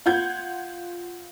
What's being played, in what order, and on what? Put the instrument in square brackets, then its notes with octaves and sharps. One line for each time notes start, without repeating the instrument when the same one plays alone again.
[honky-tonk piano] F4 F#5 G6 G#6